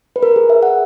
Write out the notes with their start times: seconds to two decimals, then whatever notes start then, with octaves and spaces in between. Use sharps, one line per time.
0.16 B4
0.23 A#4
0.36 G#4
0.50 E5
0.62 F#5